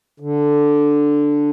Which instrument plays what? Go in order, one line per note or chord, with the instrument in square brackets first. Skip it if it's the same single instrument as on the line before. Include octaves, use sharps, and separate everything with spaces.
[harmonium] D3